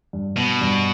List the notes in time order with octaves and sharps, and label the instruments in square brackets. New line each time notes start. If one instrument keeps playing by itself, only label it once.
[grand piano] G2
[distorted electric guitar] B2 [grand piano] B3
[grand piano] G2